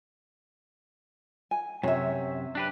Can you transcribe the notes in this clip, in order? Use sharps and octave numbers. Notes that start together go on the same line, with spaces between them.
G#5
F#2 C3 C#5 E5
D4 G4 B4